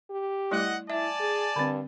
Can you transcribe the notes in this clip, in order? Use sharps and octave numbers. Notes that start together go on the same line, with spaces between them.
G4
G3 A3 E4 D#5 F#5
E4 D5 E5 G#5 A5
G#4
G2 D3 C4